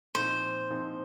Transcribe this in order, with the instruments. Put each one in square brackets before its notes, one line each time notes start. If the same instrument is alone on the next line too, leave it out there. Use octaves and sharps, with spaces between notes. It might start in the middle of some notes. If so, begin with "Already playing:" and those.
[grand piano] A#2 F3 C4 D#4 [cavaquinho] C5
[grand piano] A#2 F3 C4 D#4